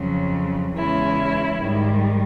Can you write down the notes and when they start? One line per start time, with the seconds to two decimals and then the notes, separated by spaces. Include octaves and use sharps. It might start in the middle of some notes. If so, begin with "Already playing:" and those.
Already playing: F2 C#3 F#3
0.75 E2 C#3 E3 G#3 C#4 E4
1.59 G#2 D#3 G3